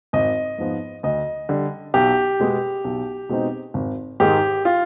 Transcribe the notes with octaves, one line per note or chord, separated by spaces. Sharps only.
G#1 D#5
G#2 F3 B3
D2 D#5
D3 G3
B1 G4
B2 G#3 B3
B1
B2 G#3 C4 D#4
G#1
G#2 D#3 G#3 G4
F4